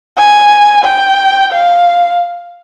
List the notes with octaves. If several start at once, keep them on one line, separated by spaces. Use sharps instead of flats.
G#5
G5
F5